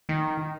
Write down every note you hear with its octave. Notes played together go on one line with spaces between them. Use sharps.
D#3